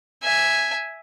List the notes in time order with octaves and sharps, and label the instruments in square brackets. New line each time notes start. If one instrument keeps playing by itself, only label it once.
[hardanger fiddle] E5 G#5